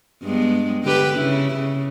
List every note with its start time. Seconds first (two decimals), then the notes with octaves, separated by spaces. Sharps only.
0.23 G2 G#3 B3
0.83 D3 G4 B4
1.18 C#3 E4
1.55 C#3